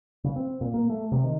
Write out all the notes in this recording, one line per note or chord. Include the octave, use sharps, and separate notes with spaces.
C#3
C4
A#2
A#3
A3
C3
D#3